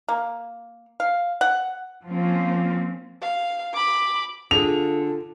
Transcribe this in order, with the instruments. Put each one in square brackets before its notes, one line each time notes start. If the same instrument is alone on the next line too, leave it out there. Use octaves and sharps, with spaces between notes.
[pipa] A#3
F5
F#5
[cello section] F3 A#3 C4 C#4 F4
[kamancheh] F5
B5 D6
[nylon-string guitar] D3 G#4 [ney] F4 [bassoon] A4 [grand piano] F7